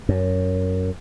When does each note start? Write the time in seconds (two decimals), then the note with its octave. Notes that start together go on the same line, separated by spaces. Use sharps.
0.09 F#2